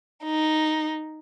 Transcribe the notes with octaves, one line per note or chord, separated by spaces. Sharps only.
D#4